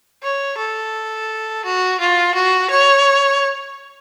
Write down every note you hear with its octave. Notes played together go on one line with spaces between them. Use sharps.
C#5
A4
F#4
F4
F#4
C#5